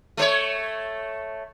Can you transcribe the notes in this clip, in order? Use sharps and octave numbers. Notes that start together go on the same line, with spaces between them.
A3 C5 C#5